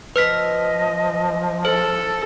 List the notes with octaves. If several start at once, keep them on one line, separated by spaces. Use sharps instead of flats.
F3 B4 D#5 F6 B6
A4 C5